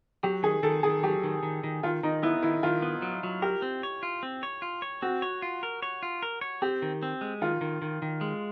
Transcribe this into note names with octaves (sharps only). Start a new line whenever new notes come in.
F#3 G4
D#3 G#4
D#3 A4
D#3 G#4
F#3 G4
D#3
D#3
D#3
D#3 F4
D#3 D#4
B3 E4
D#3 E4
D#3 F4
B3
F#3
F#3
G4 A#4
C4
C#5
F4
C4
C#5
F4
C#5
C4 F#4
C#5
F4
A#4
C#5
F4
A#4
C#5
C4 G4
D#3
C4
G#3
D#3 F4
D#3
D#3
D#3
G#3